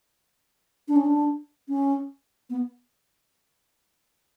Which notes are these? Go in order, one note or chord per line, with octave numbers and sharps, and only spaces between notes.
D4
C#4
D4
C#4
B3